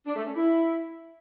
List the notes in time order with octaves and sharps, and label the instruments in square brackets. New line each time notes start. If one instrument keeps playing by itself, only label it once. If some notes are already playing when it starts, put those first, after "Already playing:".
[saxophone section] D4
A3
C#4
E4